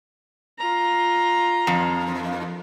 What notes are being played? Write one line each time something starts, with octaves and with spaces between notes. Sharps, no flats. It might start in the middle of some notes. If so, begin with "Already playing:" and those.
F4 A#5
F2